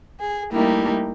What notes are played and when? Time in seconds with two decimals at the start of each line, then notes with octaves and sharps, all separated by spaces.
0.19 G#4
0.52 G3 A3 A#3 D#4 E4 G4